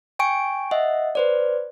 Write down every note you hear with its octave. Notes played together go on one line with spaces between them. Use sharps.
G5 G#5 C#6 D7
D#5 E5 F#5
B4 C5 D5